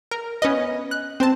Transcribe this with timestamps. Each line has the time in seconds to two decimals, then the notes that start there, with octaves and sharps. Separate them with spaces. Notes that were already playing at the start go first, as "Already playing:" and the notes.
0.11 A#4
0.42 B3 C#4 B4 D#5
0.91 F#6
1.20 C4 C5 A5